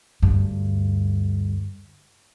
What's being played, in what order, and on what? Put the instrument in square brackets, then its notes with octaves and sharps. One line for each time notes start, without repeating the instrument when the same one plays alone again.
[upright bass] D2 G2